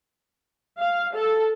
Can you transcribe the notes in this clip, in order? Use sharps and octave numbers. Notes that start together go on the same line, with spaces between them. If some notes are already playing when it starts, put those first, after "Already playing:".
F5
A4